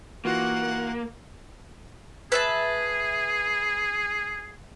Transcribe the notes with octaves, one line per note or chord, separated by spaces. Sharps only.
E3 A#3 F4 F#4 F#5
G#4 B4 E5 A5